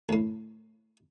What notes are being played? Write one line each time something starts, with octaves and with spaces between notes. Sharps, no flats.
D2 A2